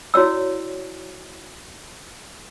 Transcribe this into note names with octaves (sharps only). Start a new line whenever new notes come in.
E4 F#4 C#5 D5 E6